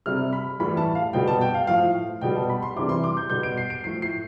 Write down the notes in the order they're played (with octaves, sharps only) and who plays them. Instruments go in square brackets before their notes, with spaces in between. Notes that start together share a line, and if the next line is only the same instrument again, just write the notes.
[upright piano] C3 G3 F6
B5
A2 E3 G3 B5
A5
F5
B2 G3 G5
A5
G5
F5
A2 F3 F5
B2 G3 G5
A5
B5
C6
C3 E3 G3 D6
C6
D6
G6
B2 G3 G6
D7
C7
D7
A2 F3 C7
C7